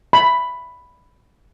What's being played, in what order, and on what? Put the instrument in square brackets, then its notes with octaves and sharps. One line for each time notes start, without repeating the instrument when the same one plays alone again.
[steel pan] B5